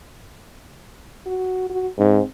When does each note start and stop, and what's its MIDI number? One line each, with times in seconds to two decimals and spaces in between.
1.26 1.68 66
1.69 1.88 66
1.99 2.21 44
1.99 2.26 60